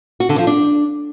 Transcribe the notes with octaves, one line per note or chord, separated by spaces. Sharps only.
F#4
D3
F3
D4